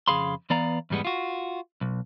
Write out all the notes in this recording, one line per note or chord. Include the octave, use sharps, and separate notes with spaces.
F2 C#3 G#4 F5 B5 C6
E3 B3 D5 F5 A#5
E2 G#2 G3 G#3 B3
F4 F#4
B1